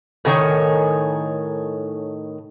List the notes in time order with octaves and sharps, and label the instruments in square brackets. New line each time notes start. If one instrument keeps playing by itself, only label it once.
[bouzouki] A2 D#3 C#5 G#5